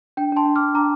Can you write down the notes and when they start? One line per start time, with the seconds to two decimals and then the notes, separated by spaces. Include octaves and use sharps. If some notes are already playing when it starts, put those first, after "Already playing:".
0.17 D4 G5
0.32 D4 A5 C6
0.46 D4
0.56 D4 D6 F6
0.74 D4 A#5 D6